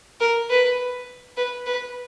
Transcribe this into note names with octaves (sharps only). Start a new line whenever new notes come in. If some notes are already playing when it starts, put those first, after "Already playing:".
A#4
B4
B4
B4